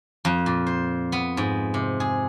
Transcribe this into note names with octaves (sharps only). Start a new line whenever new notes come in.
F2
A#2
C5
B3
G#2
C3
G#4